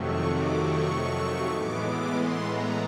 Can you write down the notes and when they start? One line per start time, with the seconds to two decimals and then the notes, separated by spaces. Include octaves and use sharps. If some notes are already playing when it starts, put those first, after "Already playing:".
Already playing: F2 C3 D#3 F#3 A3 C#6
0.25 D6
0.56 C#6
1.50 A2 E3 G#3 B3 D6
1.81 D6
2.12 C6
2.43 A#5